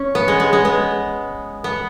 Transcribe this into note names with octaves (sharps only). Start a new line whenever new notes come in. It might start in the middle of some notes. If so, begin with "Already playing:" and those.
Already playing: C#4
B3
G#3
G#3
G#3
B3
B3